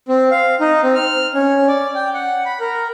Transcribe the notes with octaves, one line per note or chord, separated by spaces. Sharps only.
C4
F5
D#4
C4
F6
C#4
D5
G5
F#5
B5
A#4